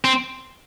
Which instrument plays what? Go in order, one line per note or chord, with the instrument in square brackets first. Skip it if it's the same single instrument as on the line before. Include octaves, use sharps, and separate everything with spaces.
[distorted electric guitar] C4